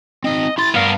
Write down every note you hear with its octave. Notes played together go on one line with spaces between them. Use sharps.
C4 D#4 D#5
E4 C6 A6
G2 B3 A#4 F5